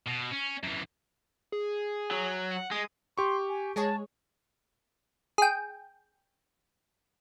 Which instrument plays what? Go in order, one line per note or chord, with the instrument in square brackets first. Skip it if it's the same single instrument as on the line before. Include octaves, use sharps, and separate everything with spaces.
[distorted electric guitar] B2
C#4
F#2 E3
[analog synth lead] G#4
[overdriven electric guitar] F#3
[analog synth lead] F#5
[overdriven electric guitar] G#3 [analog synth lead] D#6
[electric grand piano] G4 C#6 [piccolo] C6
[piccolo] G#5
[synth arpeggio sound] G#3 G#4 C#5 [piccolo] A5
[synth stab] G#4 G5